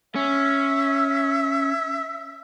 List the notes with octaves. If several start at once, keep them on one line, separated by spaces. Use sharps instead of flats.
C#4 E5